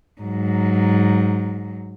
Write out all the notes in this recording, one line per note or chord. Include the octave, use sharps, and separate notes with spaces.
G#2 F#3